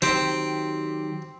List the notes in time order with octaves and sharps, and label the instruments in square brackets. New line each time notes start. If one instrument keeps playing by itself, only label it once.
[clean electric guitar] D#3 F#3 G4 [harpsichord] C4